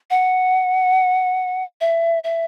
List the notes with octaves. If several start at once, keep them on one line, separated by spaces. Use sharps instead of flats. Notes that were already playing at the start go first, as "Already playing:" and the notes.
F#5
E5
E5